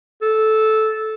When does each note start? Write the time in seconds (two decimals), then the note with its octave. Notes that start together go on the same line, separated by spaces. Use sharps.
0.22 A4